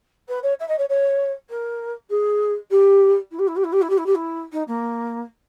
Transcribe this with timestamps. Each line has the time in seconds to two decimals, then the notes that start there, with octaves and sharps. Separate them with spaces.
0.28 B4
0.43 C#5
0.59 E5
0.68 D#5
0.78 C#5
0.89 C#5
1.49 A#4
2.10 G#4
2.70 G4
3.31 E4
3.39 G4
3.47 E4
3.56 G4
3.64 E4
3.72 G4
3.81 E4
3.89 G4
3.97 E4
4.06 G4
4.15 E4
4.52 D#4
4.67 A#3